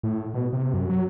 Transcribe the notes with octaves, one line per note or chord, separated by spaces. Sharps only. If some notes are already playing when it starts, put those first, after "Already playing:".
A2
B2
C3
F#2
F#3